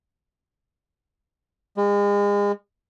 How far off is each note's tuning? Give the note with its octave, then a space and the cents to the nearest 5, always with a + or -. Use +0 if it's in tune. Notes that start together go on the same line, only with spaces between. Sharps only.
G#3 -35